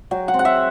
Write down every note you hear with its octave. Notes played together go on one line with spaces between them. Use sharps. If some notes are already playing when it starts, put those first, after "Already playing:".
F#3 G5
F#5
C4
F#5
E5